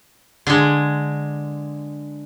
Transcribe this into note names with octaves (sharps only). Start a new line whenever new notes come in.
D3 G#3